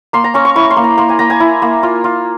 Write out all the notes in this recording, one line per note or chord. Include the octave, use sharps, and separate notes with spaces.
A#3 C6
A#5
C#4 C#6
C#6
E4 C#6
C6
A#3
A#5
A#3 C6
G#5
A#3 A#5
G#5
E4
A#3
F4
F4